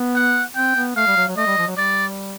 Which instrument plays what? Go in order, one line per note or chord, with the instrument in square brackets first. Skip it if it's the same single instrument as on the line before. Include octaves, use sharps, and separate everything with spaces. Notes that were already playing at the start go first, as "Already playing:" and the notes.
Already playing: [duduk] B3
[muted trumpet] F#5
[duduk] C4 [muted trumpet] G5
[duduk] B3
[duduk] A3 [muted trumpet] F5
[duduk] G3
F#3
F#3
[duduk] A3 [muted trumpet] D#5
[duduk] G3
F3
F#3
[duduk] G3 [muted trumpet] D5